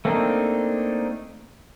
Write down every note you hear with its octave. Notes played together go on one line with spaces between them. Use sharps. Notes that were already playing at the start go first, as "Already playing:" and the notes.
A3 A#3 C4 D4 D#4